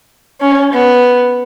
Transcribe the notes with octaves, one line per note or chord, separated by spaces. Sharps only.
C#4
B3